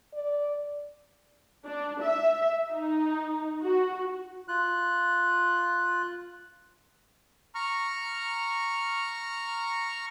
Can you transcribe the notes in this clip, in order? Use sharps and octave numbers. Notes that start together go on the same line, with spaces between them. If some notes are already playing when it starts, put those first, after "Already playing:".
D5
D4
E5
D#4
F#4
F4 F#6
A#5 C#6 F6